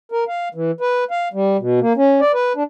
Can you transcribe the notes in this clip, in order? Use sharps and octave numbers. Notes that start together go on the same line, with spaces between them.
A#4
F5
E3
B4
F5
G3
B2
A#3
C#4
D5
B4
D4